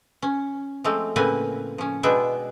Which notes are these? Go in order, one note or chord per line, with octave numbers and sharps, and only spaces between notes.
C#4
F3 G#3 A3 C4
A2 C#3 A#3 C4 B4 G#5
F3 C#4
B2 G#3 B3 D4 E5 G5